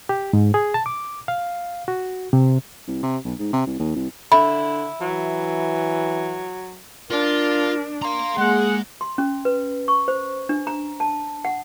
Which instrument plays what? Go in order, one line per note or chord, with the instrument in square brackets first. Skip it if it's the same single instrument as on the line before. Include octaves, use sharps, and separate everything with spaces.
[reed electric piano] G4
G#2
G#4
A5
D6
F5
F#4
C3
[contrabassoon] C2
C3
B1
G#2
C3
C2
D#2
C2
[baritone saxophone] D3 [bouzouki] E4 [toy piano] B5
[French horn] E3 [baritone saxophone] F#3
[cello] D4 [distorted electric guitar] F4 [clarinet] A#4
[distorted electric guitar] F5 A#5 [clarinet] C6
[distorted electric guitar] G#3 [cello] A#3 [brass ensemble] G#4 F#5
[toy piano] C6
C#4
B4
C#6
C5
D4
A#5
A5
F#5